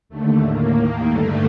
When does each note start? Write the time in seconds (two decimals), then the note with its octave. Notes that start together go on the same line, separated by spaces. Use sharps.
0.09 D#2 D3 A3
0.41 A2 A#3
0.75 D#2 D#3
1.07 G2 D3 A3